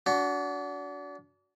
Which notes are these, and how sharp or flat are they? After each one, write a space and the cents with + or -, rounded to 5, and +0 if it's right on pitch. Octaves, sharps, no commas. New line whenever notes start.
D4 -35 F#4 +5